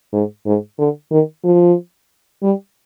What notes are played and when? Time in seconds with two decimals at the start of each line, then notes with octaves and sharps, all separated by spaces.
0.13 G#2
0.46 G#2
0.78 D3
1.11 D#3
1.44 F3
2.43 G3